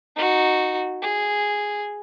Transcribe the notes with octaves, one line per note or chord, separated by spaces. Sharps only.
D#4 F#4
G#4